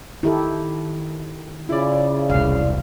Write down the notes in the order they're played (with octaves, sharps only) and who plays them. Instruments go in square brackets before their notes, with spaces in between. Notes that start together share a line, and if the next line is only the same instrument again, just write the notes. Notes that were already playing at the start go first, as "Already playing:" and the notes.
[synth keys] D#3 [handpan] E4 G4 A4
[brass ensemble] C#3 [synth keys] E4 D5 [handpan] F4
[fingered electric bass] E1 C2 [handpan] F5